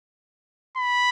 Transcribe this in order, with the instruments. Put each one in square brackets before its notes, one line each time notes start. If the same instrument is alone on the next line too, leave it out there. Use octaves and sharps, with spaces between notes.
[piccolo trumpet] B5